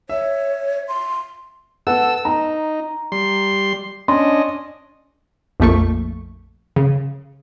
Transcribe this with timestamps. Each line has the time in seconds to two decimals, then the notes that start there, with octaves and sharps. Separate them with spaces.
0.09 C#5 E5
0.88 C6
1.87 A4 B4 F#5 E6
2.25 D#4 A#5
3.12 G3 C6
4.08 C#4 D4 D#5 C6
5.60 A#1 F2 F3 A3 A#3 C#6
6.76 C#3